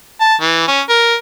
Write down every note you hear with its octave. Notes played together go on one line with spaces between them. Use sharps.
A5
E3
C#4
A#4